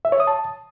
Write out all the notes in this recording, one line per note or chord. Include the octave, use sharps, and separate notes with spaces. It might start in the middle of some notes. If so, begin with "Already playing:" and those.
E5
C#5
D#6
A5